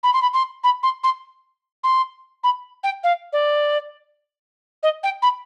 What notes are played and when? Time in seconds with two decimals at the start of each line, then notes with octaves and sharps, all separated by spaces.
0.03 B5
0.13 C6
0.22 B5
0.33 C6
0.64 B5
0.83 C6
1.04 C6
1.84 C6
2.44 B5
2.84 G5
3.04 F5
3.33 D5
4.83 D#5
5.03 G5
5.22 B5